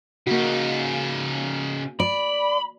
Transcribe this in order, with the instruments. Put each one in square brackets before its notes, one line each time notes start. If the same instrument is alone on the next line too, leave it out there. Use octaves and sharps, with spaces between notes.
[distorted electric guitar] C#3 D#4 [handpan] A#3 F#4
[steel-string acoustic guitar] D5 [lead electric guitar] B5